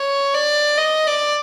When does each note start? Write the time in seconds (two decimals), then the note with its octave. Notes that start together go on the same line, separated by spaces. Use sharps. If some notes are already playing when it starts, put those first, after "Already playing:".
Already playing: C#5
0.34 D5
0.78 D#5
1.07 D5